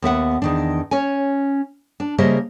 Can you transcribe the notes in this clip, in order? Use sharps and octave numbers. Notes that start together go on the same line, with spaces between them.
D#2 B3 E5 F#5
E2 D#3 D4
C#4 C#5 G#5
D4
C#3 G3 A#3 C5 D#5 E5